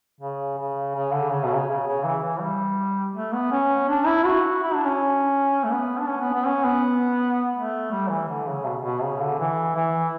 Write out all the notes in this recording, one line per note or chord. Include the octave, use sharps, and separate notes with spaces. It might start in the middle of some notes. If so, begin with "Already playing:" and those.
C#3
C#3
C#3
D3
C#3
B2
C#3
C#3
C#3
E3
E3
G3
A3
B3
C#4
D4
E4
F#4
E4
D4
C#4
A3
B3
D4
C#4
B3
B3
C#4
B3
A3
G3
E3
D3
C#3
B2
B2
C#3
D3
E3
E3